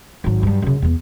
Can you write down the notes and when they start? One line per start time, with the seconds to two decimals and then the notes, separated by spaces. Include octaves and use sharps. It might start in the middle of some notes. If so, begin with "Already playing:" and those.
0.24 G#1 F#3
0.43 G2 F#3
0.62 F#2 C#3
0.82 E2 B3